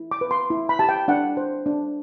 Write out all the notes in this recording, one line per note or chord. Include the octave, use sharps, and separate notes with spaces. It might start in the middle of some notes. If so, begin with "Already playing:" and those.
Already playing: E4
D6
B4
C6
E4
B5
G4 A5
G5
D4 F#5
C5
D4